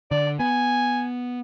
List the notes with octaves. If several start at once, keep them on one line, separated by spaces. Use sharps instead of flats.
D3 D5
B3 G#5